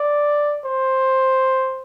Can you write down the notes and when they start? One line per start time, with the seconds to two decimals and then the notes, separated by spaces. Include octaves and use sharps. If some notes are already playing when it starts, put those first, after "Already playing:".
Already playing: D5
0.65 C5